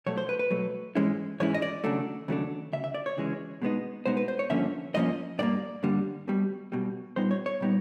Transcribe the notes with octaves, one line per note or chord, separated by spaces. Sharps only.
B2 F#3 A3 C#5
C5
B4
B4
B2 F#3 A3
G#2 E3 G#3 C#4 E4
G#2 E3 G#3 C#4 E4 C#5
D#5
D5
D#2 C#3 F#3 A3 D4
D#2 C#3 F#3 A3 D4
D2 C#3 E5
E5
D5
C#5
D2 C#3 E3 G#3 C#4
B2 G#3 B3 D#4
B2 G#3 B3 D#4 C5
B4
C5
C#5
G2 D3 F3 A#3 C#4 E5
G2 D3 F3 A#3 C#4 D#5
G2 D3 G3 A#3 D5
G2 D3 G3 A#3
B1 B2 G3
B1 B2 G3
A#2 G3 B3 D#4 C5
C#5
C#5
A#2 G3 B3 D#4